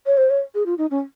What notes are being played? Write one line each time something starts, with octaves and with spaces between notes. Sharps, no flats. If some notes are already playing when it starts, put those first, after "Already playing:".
C#5
C5
C#5
G#4
F4
D#4
C#4